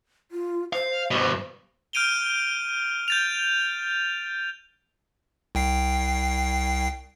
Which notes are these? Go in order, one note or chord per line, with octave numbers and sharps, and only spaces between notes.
F4
C5 F5
G2 B2
F6 G6 D7 D#7 F7 G7
G6 A6 F7
C2 G5 C7